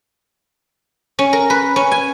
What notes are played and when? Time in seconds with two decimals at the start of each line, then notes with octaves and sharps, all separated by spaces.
1.19 C#4
1.33 A#4
1.50 B4
1.76 C#4
1.92 G#5